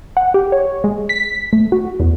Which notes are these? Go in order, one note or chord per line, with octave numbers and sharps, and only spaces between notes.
F#5
G4
C#5
G#3
B6
A3
F#4
E2